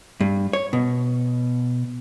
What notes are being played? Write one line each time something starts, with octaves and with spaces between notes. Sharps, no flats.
G2
C#5
B2